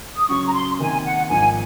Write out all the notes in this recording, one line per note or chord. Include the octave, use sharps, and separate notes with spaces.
D#6
C#3 F#3 C#4 C#6
A#5
C6
C3 D#3 A#3 G#5
F#5
G#1 G#2 F3 A#3 G#5